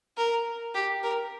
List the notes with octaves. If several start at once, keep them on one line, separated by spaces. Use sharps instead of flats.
A#4
G4
A#4